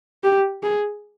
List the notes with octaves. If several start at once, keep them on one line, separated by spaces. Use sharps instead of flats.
G4
G#4